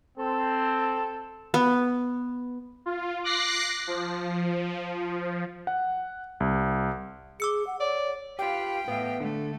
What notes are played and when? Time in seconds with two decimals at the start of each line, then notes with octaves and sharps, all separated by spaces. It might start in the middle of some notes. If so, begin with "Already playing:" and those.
0.18 C4 A4
1.54 B3
2.86 F4
3.24 D6 F#6 A#6 C7
3.87 F3
5.67 F#5
6.40 C2
7.40 G#4 D6 E6 C#7
7.67 F#5
7.80 C#5 D5
8.39 F4 G4 B4 F5 G5
8.88 A2 B3 E5 F5
9.20 D3 A3